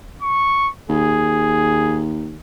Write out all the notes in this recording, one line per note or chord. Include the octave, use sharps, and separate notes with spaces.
C#6
D#2 G#4